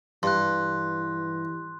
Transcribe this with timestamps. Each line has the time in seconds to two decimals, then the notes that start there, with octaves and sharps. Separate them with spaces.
0.23 G2 E3 C6 F#6